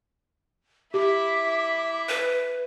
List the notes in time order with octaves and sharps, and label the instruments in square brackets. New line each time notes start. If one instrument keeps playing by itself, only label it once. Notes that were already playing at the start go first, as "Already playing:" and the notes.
[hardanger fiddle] E4 E5 [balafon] G4 [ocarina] D6
[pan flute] B4